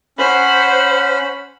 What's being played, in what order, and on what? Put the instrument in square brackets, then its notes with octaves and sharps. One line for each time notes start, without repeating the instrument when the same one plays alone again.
[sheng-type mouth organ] C#4 B5 [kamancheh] C5 F#5